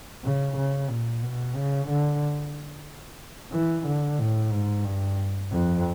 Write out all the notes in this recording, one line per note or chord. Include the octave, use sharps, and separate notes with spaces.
C#3
C#3
A#2
B2
C#3
D3
E3
D3
A2
G#2
G2
F2